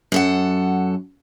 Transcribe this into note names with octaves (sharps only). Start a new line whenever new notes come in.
F#2 A4 F#5